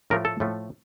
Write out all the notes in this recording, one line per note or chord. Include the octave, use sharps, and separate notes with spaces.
A2 F3 A3 A#4
A4
A2 F3 A3